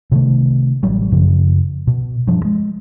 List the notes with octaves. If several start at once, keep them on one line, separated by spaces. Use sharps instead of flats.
C3 D#3 A3
A1 F#3 G3
F#2 C#3 F3
B2
G2 F3
G#3